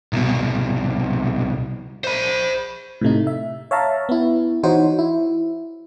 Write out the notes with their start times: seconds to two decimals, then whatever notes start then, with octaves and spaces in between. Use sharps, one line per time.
0.13 C2 B2
2.04 C5 B5
3.01 A2 C3 A3 D#4
3.27 E5
3.71 C#5 E5 F5 A5 A#5
4.09 B3 E4
4.63 E3 D#4 F#4 C5 C#5
4.99 E4